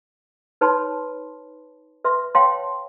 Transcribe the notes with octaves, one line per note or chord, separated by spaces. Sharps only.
D#4 B4 C#5 A5 B5 C6
B4 E5 C6
C#5 F5 G5 A5 C6